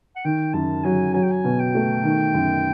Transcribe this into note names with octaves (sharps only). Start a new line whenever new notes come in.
F#5
D#3 G5
F#2 A5
F#3 G#5
F#3 G#5
G5
G#5
B2
G5
A3
D#3
F#2